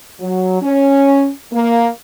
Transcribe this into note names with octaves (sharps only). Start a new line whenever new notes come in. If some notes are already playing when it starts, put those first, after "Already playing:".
F#3
C#4
A#3